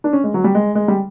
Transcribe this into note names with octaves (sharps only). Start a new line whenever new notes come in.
D4
C#4
G#3
F#3
G3
G#3
G#3
G3